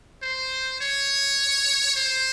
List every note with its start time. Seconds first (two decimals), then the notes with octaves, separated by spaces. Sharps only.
0.22 C5
0.80 C#5
1.96 C5